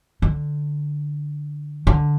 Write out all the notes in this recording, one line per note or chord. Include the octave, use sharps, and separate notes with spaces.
D3
D3